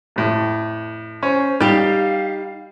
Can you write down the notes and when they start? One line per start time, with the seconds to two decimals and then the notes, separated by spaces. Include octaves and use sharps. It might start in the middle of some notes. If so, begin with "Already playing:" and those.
0.16 F2 A2
1.23 C#4 C5
1.60 G3 D#4 G4 F5